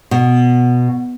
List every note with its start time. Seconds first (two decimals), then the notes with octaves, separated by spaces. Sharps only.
0.11 B2